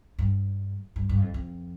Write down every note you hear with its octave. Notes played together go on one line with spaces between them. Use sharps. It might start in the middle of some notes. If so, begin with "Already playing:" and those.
G2
G2
G2
F2
F2